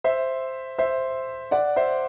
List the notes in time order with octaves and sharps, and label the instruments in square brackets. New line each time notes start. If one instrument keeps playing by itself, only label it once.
[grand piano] C5 E5
C5 E5
D5 F#5
C5 E5